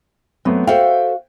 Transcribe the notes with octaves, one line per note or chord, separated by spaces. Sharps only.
F#3 A3 B3 C4
F#4 A4 C5 E5 F5 G5